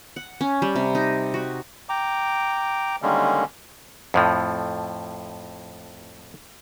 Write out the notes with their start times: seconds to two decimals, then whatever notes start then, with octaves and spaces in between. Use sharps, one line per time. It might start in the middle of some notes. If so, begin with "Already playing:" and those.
0.16 F#5
0.41 C#4
0.62 G3
0.76 C3
0.95 D#4
1.34 F#4
1.89 G5 A#5 D6
3.02 D3 D#3 G3 G#3 A#3 C#4
4.14 F2 A2 F3